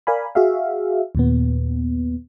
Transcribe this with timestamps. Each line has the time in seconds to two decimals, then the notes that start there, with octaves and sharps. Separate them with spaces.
0.07 A#4 D5 F5 G#5 B5
0.35 F#4 G#4 E5 F5
1.15 D#2 A#2 B3